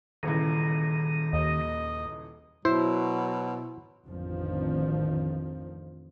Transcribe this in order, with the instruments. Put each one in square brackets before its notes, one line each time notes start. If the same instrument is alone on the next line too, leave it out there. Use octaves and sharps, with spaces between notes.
[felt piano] D#1 C#2 E3 [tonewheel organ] D#3
[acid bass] D#2 [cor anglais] D#5
[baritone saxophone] B2 [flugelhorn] F#3 [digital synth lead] E4 [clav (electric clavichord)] C5
[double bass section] A1 F2 D3 D#3 F3